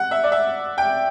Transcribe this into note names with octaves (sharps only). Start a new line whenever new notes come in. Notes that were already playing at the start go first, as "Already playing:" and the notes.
Already playing: F#5
E5
D5
E5
G5